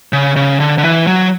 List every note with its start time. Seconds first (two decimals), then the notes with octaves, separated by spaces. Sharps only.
0.13 C#3
0.36 C#3
0.60 D3
0.78 D3
0.83 E3
1.07 F#3